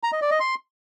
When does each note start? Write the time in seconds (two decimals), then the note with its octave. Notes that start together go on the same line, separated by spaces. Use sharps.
0.04 A#5
0.13 D#5
0.22 D5
0.31 D#5
0.40 C6